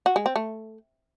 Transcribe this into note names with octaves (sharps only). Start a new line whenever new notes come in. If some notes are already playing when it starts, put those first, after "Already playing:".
F#4
G#3
C4
A3